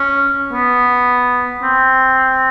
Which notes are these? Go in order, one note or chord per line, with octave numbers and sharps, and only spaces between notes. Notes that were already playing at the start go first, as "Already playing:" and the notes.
Already playing: C#4
B3
C4